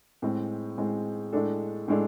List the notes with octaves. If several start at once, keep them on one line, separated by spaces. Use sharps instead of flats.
A2 G#3 C4
A2 G#3 C4
A2 G#3 D4 A4
A2 G#3 D4 A4